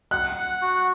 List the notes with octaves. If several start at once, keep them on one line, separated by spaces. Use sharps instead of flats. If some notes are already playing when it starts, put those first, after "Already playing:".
F#5 F#6
F#5
F#4